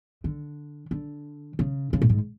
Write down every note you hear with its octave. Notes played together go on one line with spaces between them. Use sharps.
D3
D3
C#3
C#3
A2
G#2